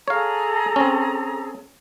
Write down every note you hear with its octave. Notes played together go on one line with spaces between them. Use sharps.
G#4 A4 C#5 F5 A#5
C4 C#4